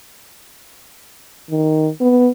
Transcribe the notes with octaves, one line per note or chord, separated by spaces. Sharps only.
D#3
B3